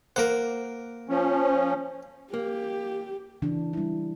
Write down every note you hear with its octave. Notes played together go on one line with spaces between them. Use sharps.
A#3 A#4 C5 F#5
F3 C#4
A#3 G4
C#3 E3 D4
G3 E4